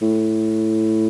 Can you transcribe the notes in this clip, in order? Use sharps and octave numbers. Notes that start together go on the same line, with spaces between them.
A2